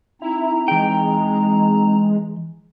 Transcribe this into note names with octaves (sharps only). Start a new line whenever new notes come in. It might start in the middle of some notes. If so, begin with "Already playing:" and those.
C4 D#4 E4 A#5
E3 G#3 G5